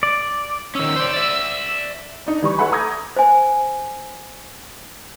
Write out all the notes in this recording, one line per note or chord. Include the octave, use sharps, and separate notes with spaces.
D5
D#3 C#4 E6
C5 D5
D5 E5
D4 D#4 D5
E3 G3 C#6
A4 B4 E5 F#5 G#5 B5
A#5 D6 D#6 G6 G#6 A#6
C5 G#5